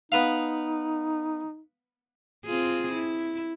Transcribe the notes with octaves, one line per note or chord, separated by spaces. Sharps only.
B3 D#4 B4 F5
C4 F4 G#4
E4